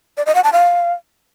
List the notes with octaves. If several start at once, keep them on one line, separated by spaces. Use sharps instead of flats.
D5
D#5
F#5
A5
F5